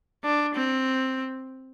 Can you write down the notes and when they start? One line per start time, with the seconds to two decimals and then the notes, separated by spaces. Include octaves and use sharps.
0.24 D4
0.55 C4